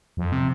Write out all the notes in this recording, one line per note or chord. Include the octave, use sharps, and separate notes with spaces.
F2
C3